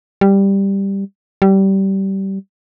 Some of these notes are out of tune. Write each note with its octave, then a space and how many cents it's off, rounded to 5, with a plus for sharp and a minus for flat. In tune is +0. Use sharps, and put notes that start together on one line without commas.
G3 +5
G3 -20